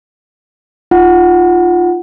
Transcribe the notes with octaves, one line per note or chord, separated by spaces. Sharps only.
D#4 F4 F#5